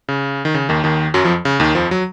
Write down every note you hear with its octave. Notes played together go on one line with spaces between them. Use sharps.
C#3
D#3
C#3
D#2 D#3
D#2 D#3
F#2 F#3
F2 F3
C#3
D#2 D#3
F2 F3
F#3